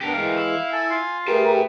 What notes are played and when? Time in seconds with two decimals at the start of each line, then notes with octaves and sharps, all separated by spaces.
0.01 B3 D4 G4 A#4
0.14 E3 G#3 F5
0.37 E4
0.73 A4 G#5
0.90 F4
1.28 A3 G4 G#4 A#4 B4 G5 A5